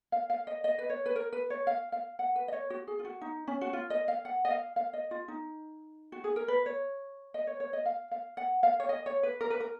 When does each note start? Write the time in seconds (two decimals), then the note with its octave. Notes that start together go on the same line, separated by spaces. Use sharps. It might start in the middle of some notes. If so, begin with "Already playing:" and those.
0.12 F5
0.30 F5
0.47 D#5
0.64 D#5
0.78 B4
0.90 C#5
1.06 B4
1.16 A#4
1.33 B4
1.50 C#5
1.67 F5
1.92 F5
2.19 F#5
2.36 B4
2.48 D#5
2.53 C#5
2.70 F#4
2.87 G#4
2.99 F4
3.05 F#4
3.21 D#4
3.48 C#4
3.61 F#4
3.73 F4
3.90 D#5
4.08 F5
4.25 F#5
4.45 D#5
4.51 F5
4.76 F5
4.93 D#5
5.11 F4
5.28 D#4
6.12 F#4
6.24 G#4
6.36 A#4
6.48 B4
6.66 C#5
7.34 D#5
7.47 C#5
7.60 C#5
7.73 D#5
7.86 F5
8.11 F5
8.37 F#5
8.63 F5
8.80 C#5
8.89 D#5
9.06 C#5
9.23 B4
9.41 A#4
9.50 B4
9.60 A#4